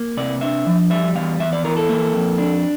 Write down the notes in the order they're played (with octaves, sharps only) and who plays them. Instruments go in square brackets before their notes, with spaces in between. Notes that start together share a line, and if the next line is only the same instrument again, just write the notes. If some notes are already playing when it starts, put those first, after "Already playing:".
Already playing: [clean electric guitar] A#3
C3 D5
D4 E5
F3
G3 E5
E2 F5
E2 E5
D5
E3 A#4
A4
A#3
F2
D4